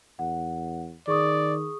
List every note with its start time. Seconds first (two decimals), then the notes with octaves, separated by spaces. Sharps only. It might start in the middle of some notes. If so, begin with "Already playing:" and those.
0.19 E2 F#5
1.08 D#3 G#4 D5 C#6 D#6